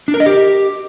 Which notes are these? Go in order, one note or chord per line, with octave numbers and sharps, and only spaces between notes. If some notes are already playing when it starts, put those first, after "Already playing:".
D4
A#4
D#5
G4